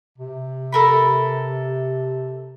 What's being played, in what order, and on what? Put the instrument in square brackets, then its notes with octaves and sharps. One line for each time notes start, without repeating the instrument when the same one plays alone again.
[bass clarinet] C3
[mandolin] A4 A#4 B5